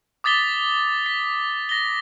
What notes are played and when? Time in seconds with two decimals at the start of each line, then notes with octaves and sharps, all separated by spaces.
0.24 D6 D#6 A6 B6 G7
1.06 B6
1.69 A#6 G7